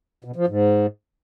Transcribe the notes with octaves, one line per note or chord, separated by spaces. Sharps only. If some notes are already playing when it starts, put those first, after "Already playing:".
B2
F3
G#2